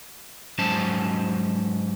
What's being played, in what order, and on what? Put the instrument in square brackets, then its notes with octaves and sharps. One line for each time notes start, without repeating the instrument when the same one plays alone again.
[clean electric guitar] G#2 F#3 C#4 C5 A5